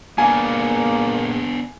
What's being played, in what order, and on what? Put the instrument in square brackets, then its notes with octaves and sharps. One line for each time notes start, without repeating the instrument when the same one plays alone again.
[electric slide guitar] A#2 G#4 F5 [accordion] A#3 [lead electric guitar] B3 D4 [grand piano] G#5